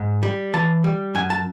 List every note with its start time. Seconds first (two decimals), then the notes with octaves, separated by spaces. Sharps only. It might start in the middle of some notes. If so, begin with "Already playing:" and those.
Already playing: G#2
0.23 G3
0.54 E3 A5
0.84 G3
1.15 F#2 G#5
1.30 A5